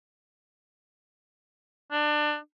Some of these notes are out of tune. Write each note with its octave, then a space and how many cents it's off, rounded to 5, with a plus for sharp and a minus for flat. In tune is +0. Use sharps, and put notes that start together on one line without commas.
D4 +25